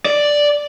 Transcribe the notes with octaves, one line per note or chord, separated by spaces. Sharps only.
D5